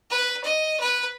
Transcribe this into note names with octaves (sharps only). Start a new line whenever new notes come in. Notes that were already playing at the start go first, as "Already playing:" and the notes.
B4
D#5
B4